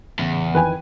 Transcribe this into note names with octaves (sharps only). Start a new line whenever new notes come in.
E2 A2 C#3
F2 D#3 E3 B4 G5 G#5